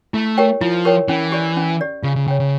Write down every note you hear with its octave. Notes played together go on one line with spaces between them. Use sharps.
A3 E4
G4 A#4 C#5 G5
F3 E4
G4 A#4 C#5 G5
E3 C#4
G4 D5
C#4
G4 D5
C#3 F4
C#3
C#3 C#5 G5
C#3